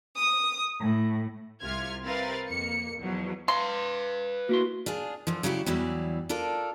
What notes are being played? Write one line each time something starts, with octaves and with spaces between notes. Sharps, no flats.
D#6
A2
C2 C3 F4 F6 G#6
C3 C4 A#4 B4 F5 A6
F2 A#3 C#7
E2 B2 F3 F#3
B4 F5 C6
A#3 E4 F#4 C6
D4 F4 G#4
D3 E3 F3
C#3 F#3 G3 E4 F4 G4
E2 E3 F#3 G3 E4 D5
D4 F4 A4 A#4 D5